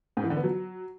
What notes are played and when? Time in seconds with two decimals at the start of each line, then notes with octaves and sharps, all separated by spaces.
0.17 G#2
0.24 E3
0.30 D3
0.37 B3
0.44 F#3